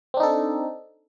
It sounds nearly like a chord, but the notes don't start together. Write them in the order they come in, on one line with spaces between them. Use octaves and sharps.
C4 D4 D#4 A4